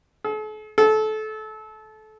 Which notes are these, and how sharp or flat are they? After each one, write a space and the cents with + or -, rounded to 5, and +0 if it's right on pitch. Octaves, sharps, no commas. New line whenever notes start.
A4 -45
A4 -25